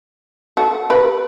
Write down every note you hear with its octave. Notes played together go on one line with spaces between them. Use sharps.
F#4 A4
G4 B4